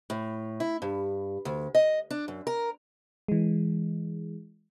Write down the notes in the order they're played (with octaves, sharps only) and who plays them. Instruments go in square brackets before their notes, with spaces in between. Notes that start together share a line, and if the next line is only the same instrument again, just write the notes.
[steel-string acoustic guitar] A2
E4
G2
D2
D#5
D4
F#2
A#4
[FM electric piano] E3 G#3